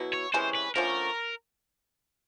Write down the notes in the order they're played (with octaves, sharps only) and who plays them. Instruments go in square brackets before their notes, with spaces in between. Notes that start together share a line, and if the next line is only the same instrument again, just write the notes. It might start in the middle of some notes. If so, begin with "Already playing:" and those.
Already playing: [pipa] B2 F#3 B3 E4
[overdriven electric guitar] C#5
[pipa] C3 E3 G#3 C#4 [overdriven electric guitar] C5
[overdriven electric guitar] B4
[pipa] D3 F3 A3 C#4 [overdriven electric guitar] A#4